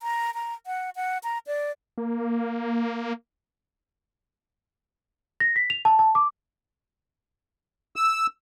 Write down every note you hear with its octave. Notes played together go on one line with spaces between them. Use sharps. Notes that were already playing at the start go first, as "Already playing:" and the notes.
A#5
A#5
F#5
F#5
A#5
D5
A#3
A#6
B6
F7
A5
A5
D6
E6